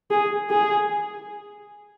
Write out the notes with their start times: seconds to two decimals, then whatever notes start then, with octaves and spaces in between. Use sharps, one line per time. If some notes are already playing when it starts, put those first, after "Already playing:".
0.11 G#4
0.50 G#4